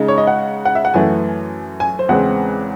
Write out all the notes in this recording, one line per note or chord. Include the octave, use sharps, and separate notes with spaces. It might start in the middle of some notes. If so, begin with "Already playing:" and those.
Already playing: C#3 G#3 D#4
C#5
D#5
F#5
F#5
E5
F#5
F#2 E3 A3 G#5
G#5
C5
E2 C#3 E3 G#3 C4 F#5